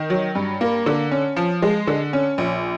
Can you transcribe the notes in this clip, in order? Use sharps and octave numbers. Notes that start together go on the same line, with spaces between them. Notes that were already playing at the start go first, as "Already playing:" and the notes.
Already playing: D#3
F#3
G2
A#3
D3
C#4
F3
G#3
D3
C#4
A#1